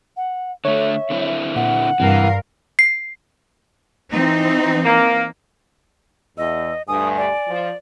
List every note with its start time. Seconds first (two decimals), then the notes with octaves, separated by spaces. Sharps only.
0.17 F#5
0.65 D3 A3 C#5 E5
1.10 D3 C4 E4
1.56 A#2 F#5
2.00 G2 C3 E3 A#4 F5
2.79 C7
4.12 E3 C4 D#4
4.84 A#3
6.38 E2 D#5 E6
6.88 D2 G2 G#5 D#6
7.17 D5
7.48 F3